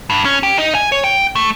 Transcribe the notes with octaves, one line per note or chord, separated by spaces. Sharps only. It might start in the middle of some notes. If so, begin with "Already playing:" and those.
G2
C#4
G4
D#4
G#5
C#5
G5
A3